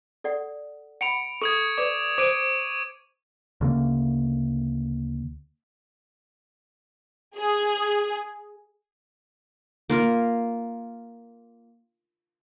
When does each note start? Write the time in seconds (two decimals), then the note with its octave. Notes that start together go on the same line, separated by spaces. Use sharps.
0.24 A4 D5 F#5
1.01 F#5 B5 C#7 D7 F7
1.42 A4 C#6 D#6 G#6
1.78 B4 D5 D6
2.18 C5 D6 D7 D#7
3.61 D2 C#3 A3 A#3
7.37 G#4
9.90 A#3 F4 A#4